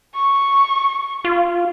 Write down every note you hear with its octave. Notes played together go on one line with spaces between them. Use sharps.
C#6
F4